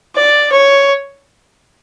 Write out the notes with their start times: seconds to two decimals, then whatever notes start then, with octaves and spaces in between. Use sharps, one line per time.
0.16 D5
0.52 C#5